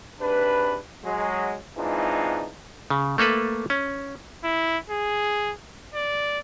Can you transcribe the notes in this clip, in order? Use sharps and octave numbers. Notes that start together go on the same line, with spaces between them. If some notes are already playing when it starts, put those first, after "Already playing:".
G#2 C3 D4 B4
F#3 G#3
E3 G#3 C4 D4 D#4 F4
C#3
A3 A#3 A4 B4
C#4
E4
G#4
D5